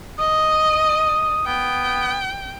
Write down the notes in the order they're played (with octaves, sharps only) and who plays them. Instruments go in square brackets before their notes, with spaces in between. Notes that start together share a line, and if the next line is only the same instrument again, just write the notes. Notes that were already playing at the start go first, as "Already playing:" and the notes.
[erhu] D#5 [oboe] D#6
[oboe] B3 [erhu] G5